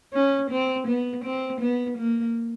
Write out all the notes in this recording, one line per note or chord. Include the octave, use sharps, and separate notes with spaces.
C#4
C4
B3
C4
B3
A#3